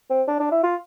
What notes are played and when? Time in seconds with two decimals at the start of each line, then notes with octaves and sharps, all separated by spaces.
0.10 C4
0.28 D4
0.40 D4
0.51 E4
0.63 F4